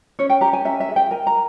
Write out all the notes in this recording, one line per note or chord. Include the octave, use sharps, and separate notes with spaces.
C#4 C#5
G5
G4 A#5
G#5
C#4 E5
E5
G#4
G5
A#4 G#5
A#5